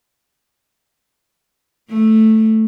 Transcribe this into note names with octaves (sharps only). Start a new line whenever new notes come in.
A3